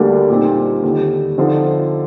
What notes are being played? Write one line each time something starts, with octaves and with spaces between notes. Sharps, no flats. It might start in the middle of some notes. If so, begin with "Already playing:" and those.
Already playing: D2 D3 G3 A#3 D4
A#2 G3 C4 D#4 G4
D#2 D3 G3
D3 F3 C4 D#4